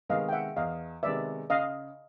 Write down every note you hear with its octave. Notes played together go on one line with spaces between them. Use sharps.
C3 D#3 G#3 B3 D#5 F5
G5
E5 F#5
E2 D#5 F5
C3 D#3 G#3 B3 D5 E5
C#3 D#5 F5